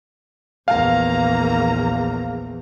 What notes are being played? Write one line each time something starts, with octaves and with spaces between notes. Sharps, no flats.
A#1 E2 A#3 F5 A#5